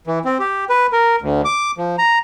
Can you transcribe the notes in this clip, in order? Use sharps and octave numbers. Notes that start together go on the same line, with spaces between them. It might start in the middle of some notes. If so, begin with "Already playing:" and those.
E3
C4
G4
B4
A#4
D2
D6
F3
A#5